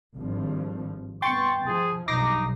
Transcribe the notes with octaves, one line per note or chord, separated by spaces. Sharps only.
G#1 G2 F3
G2 B3 G5 C6 C#6 A6
F3 G#4
B1 G2 D#4 D6 A#6 C7